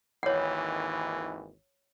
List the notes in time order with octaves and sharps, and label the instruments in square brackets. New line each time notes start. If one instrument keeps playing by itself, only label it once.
[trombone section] G#1 D#2 E3 [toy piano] C#5 F#5